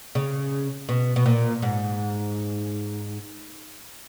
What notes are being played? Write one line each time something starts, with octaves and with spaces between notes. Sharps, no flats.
C#3
B2
B2
A#2
G#2